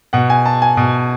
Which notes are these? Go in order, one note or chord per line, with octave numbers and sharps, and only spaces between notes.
B2 F#5
G#5
A5
G#5
B2